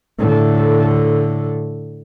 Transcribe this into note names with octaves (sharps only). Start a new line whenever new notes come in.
A2 D3